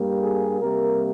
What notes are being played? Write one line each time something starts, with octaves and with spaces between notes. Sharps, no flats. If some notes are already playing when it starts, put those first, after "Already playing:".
Already playing: G2 G3 A#3
G#4
C3 G3 A#3 A#4